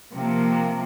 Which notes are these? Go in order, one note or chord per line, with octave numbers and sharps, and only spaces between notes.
C3 F3 A#3